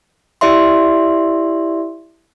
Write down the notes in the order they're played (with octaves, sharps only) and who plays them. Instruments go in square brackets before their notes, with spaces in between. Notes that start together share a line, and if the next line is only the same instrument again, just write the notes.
[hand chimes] E4 G4 D5 E5 C6